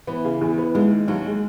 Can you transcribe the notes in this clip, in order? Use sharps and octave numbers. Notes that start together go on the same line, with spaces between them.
E3 B3
C#3
E2
B3
D#2 G#3
D#3
D#2 F#3
G#3